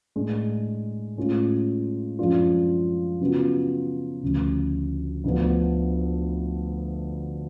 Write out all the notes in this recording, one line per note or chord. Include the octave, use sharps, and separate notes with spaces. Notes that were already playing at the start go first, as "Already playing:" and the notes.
A2 G#3 D4
A2 G#3 C#4 F4
F#2 F3 G#3 D4 F4
C#3 F#3 B3 F4
D2 C#3 F3
D2 D3 F3 B3